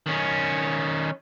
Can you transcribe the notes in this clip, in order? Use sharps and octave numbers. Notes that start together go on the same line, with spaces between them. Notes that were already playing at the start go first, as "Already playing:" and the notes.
D#3 C#4